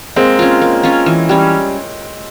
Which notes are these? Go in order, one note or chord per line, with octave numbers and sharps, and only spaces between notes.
G#3 A#3 C4
C#4 F4
A#3
C#4 F4
E3
G3 C#4